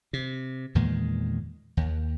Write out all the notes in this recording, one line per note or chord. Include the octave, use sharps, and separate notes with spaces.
C3
E2 A#2 D#3 G#3
D#2